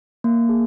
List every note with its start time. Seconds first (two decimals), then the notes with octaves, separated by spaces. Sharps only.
0.24 A#3
0.49 G#4